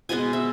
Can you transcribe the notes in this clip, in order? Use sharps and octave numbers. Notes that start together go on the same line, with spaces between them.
B2 G#3 B3 G#5
E5